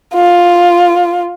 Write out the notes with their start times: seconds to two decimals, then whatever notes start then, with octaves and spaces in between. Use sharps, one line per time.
0.14 F4